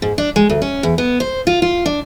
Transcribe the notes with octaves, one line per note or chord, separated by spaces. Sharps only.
G#2
D4
G#3
D2
C#4
E2
B3
C5
F4
F4
D4